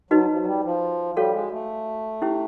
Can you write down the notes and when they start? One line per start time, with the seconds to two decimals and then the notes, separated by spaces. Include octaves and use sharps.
0.10 F#3 D#4 F#4 B4 D#5
0.32 F3
0.39 F#3
0.46 G3
0.64 F3
1.16 G3 F#4 A4 C#5 F5
1.34 G#3
1.52 A3
2.22 C#4 E4 G4 C5